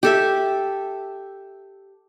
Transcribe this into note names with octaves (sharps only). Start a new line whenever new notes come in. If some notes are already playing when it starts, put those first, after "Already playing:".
G4 A4 E5